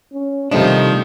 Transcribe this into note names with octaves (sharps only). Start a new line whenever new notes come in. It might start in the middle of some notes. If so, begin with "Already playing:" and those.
C#4
C3 D#3 F3 G3 A3 D4